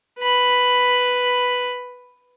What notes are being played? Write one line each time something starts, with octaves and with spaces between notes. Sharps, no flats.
B4 B5